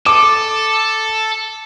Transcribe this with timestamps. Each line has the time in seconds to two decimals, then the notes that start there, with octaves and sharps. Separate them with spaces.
0.06 A4 D6